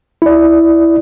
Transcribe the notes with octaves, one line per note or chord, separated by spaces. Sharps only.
E4 D5